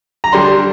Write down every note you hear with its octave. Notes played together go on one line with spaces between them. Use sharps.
A#5
D3 G3 D4 C6